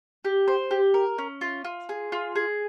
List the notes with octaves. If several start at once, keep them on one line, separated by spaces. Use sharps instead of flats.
G4
C5
G4
A#4
C#4
F4
F4
G#4
F4
G#4